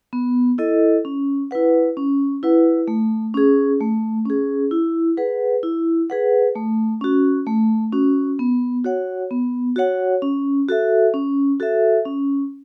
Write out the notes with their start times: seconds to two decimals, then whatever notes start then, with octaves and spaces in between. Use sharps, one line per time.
0.13 B3
0.58 E4 A4 D#5
1.05 C#4
1.51 E4 B4 F#5
1.97 C#4
2.43 E4 B4 F#5
2.88 A3
3.34 C#4 G#4
3.81 A3
4.26 C#4 G#4
4.71 E4
5.17 G#4 B4 F#5
5.63 E4
6.10 G#4 B4 F#5
6.56 A3
7.01 C#4 F#4
7.46 A3
7.93 C#4 F#4
8.39 B3
8.85 F#4 C#5 F#5
9.31 B3
9.76 F#4 C#5 F#5
10.22 C#4
10.69 F#4 A4 E5
11.14 C#4
11.60 F#4 A4 E5
12.05 C#4